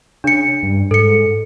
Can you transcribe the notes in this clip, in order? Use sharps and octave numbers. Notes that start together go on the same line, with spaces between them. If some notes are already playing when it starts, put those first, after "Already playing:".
C#3 D4 C#7
G2
G#2 A4 C#7